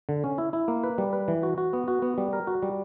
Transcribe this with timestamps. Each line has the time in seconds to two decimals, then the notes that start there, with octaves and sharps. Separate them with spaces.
0.09 D3
0.24 C#4
0.38 E4
0.53 E4
0.68 A#3
0.84 B4
0.98 G3
1.13 B4
1.28 E3
1.43 F#4
1.58 F#4
1.73 B3
1.88 F#4
2.02 B3
2.18 G3
2.33 A#4
2.47 F#4
2.63 G3